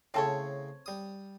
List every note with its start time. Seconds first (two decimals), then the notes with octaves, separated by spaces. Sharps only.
0.14 A2 C#3 C4 A4 C#5
0.86 G3 D#6